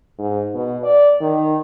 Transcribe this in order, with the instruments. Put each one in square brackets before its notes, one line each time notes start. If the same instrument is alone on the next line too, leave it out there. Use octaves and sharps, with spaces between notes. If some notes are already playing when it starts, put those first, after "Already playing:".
[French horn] G#2
B2
D5
D#3